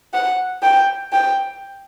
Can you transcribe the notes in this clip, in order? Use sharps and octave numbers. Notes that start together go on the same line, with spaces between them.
F#5
G5
G5